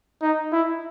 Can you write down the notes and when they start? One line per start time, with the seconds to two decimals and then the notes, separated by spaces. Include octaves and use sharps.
0.22 D#4
0.53 E4